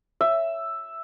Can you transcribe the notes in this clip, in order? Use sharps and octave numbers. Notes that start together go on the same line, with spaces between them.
E5